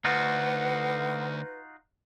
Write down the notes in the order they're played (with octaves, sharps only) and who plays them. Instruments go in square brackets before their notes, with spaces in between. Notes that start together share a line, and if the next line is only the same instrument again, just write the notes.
[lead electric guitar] D2 [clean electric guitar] D#4 F4 F#4 [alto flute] B4 [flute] F#5